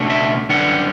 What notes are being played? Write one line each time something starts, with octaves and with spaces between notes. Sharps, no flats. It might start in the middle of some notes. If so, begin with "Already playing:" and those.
Already playing: C#2 B2 A3 D4
E5
F#2 D3 G3 B3 D4 F#5